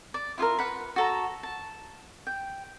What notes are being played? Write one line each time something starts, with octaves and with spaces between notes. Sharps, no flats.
D5
E4 F4 G#4 A#4
B4 F#5 B5
F#4 A4 A#5
A5
G5